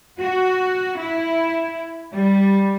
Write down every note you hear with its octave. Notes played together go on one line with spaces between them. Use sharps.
F#4
E4
G3